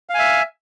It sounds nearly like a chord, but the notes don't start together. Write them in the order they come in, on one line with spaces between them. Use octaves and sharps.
F5 G#5 E5